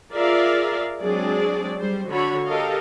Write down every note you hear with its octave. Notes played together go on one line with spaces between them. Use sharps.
F4 G#4 A#4 D5 E5 F5
F#3 G#3 C4 D4 G#4 D5
G3 C5
D3 F#4 C#5 B5
G4 A4 A#4 D#5 F5